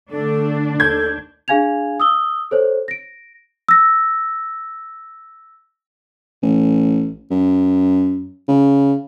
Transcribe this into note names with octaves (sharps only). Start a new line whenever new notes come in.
D3 A3 D4 A4
D#2 A4 G6 G#6
D4 G#4 F5 G#5 G#6 F7
D#6 E6 G7
A4 C5 C#5
A#6 D7
E6 A#6
A1
F#2
C#3